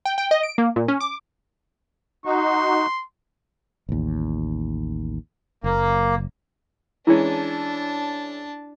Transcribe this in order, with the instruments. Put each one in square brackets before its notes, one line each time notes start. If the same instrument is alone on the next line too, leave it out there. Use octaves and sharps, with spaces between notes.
[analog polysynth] G5
G5
D#5
D7
A#3
A#2
C#4
D6
[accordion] D#4 F#4 [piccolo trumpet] C6
[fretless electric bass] A1 D#2
[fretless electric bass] F#1 [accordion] A#3
[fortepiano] E3 G#3 C#4 [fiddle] D4 A5 [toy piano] E4